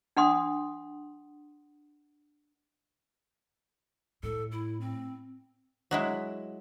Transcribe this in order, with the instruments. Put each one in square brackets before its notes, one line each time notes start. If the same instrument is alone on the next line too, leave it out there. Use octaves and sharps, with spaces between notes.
[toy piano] D4 F#5 C6 D#6
[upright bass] A2 [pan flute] A4
[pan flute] E4
C4
[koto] F#3 G#3 E4